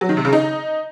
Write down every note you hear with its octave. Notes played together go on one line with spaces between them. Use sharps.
F#3
D#3
C3
C#3
D#4